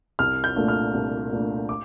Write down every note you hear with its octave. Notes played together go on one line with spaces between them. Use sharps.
C2 F6
G6
A#2 A3 D4
F6
C2
A#2 A3 D4
D6